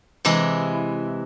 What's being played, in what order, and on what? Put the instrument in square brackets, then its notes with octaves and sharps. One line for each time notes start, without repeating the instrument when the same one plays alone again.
[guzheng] C3 E3 G#3 E4